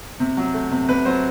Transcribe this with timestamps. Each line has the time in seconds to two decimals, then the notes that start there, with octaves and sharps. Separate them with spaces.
0.20 C3
0.37 F#3
0.54 A3
0.71 C3
0.88 C3 B4
1.05 F#3 C5